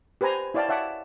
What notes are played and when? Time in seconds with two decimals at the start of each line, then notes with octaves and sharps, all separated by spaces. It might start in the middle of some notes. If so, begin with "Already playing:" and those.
0.21 G4 B4 C5 G#5 A#5
0.54 E4 C#5 D5 F5 G5 A5
0.69 C#5 E5 F#5 A5 D6